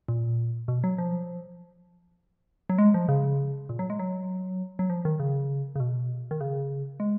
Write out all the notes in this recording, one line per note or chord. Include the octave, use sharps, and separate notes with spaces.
A#2
B2
F#3
F3
F#3
G#3
F3
C#3
A#2
F#3
G#3
F#3
F#3
F3
D#3
C#3
C#3
B2
D#3
C#3
G#3